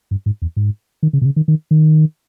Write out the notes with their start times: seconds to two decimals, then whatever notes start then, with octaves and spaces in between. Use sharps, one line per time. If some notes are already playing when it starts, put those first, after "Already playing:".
0.11 G2
0.26 G#2
0.42 E2
0.56 G#2
1.03 D#3
1.13 C#3
1.21 B2
1.25 C#3
1.36 D#3
1.48 D#3
1.71 D#3